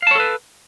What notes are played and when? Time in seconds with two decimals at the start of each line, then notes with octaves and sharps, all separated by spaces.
0.02 F5
0.07 A5
0.11 C#5
0.15 A4
0.20 B4